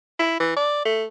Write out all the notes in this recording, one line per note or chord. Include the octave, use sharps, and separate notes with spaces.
E4
E3
D5
A3